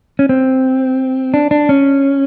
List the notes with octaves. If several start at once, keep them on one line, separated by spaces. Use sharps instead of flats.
C#4
C4
D4
D4
C#4